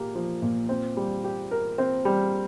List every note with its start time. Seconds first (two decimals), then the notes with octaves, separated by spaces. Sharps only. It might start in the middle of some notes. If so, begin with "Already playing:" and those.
Already playing: A#2 A#3 G4
0.15 F3
0.42 A#2
0.69 C4
0.97 G3
1.24 G4
1.51 A#4
1.78 C4
2.05 G3